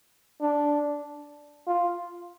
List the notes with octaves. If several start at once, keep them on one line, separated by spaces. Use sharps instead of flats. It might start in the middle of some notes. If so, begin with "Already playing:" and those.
D4
F4